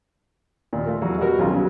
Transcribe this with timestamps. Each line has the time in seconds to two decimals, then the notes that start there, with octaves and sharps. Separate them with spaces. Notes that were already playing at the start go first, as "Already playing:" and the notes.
0.73 D#2 A#2
0.86 A3 F4 A4 A#4
1.02 E2 F#3 F#4 A#5
1.18 B2 G3 B3 F#4 A#4
1.39 B1 D#3 G#3 C#4 F4 A#5
1.51 C#3 F#3 G3 B3 C#4